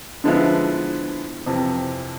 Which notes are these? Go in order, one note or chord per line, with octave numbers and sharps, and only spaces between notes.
D3 F3 G#3 B3 E4
F2 C3 E3